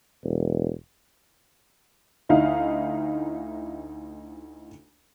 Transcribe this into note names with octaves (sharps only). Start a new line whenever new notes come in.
E1
D2 D#4 E4 F5